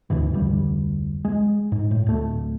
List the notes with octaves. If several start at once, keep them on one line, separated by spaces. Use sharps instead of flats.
D2 G#2 C#3 E3
F1 D2 G3
G#3
G#2
A2
D1 A3